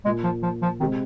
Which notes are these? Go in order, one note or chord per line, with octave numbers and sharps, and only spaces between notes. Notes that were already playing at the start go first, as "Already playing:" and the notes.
A#2 G#3 A#3 F4
F3
F3
F3
C3 D#3 G#3 C4